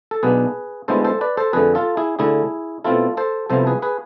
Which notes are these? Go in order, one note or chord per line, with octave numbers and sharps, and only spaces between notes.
A4
B1 B2 B3 D4 G#4 B4
D2 D3 G#3 B3 E4 A4 C5
A4 C5
B4 D5
A4 C5
F2 D3 A3 G#4 B4
F4 A4
E4 G#4
D2 D3 A3 E4 G#4
B2 A3 C4 E4 F4 A4
A4 C5
C2 C3 F3 B3 E4 A4 C5
G#4 B4
G#4 B4